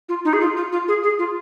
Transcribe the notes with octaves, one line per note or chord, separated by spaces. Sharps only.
F4
D#4
G#4
F4
F4
F4
G#4
G#4
F4